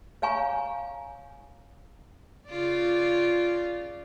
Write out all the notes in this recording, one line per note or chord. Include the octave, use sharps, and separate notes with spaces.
C#5 F5 G#5 A#5 C#6
C#3 F4 D5